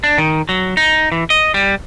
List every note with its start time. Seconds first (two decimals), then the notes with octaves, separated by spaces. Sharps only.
0.04 D4
0.18 D#3
0.49 F#3
0.77 D#4
1.12 E3
1.30 D#5
1.54 G3